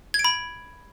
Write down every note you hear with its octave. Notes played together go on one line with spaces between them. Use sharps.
G#6
D7
B5